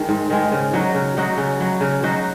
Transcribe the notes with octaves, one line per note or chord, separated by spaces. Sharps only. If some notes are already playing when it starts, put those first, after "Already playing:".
Already playing: D#3 G#3
G#2
D#3 G#3
C#3
F#3 D#4 F#4
C#3
F#3 D#4 F#4
C#3
F#3 D#4 F#4
C#3
F#3 D#4 F#4